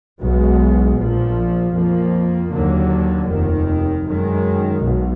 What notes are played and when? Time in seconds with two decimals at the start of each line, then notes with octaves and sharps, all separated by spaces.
0.20 B1 B2 G#3 B3
0.97 A#1 A#2 F3
1.75 F2 F3 A#3
2.51 D#2 D3 F#3 A#3
3.29 F1 D#2 D#3
4.06 F#2 D#3 G#3
4.83 B1 B2